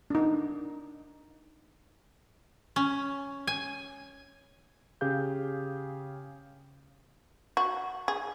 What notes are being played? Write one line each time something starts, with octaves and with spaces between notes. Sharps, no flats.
D4 D#4
C#4
G#5
C#3 G4 G#4 F5 G6
F#4
G#4